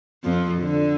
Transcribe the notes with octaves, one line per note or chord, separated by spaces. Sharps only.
F2 F3
D3